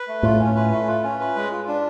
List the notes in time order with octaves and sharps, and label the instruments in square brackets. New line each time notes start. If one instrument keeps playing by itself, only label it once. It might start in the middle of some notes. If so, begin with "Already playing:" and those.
Already playing: [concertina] B4
A3
[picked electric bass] A2 [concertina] F4
[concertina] C#4
B4
A3
F4
C#4
B4
G#3
F4
D4